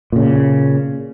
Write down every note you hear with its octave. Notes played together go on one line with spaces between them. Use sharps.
A#2 C#3